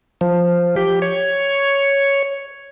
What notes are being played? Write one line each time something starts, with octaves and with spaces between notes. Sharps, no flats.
F3
G4
C#5